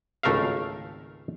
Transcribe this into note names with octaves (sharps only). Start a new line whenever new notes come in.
G#1 C#2 A3 A#4 E5 F5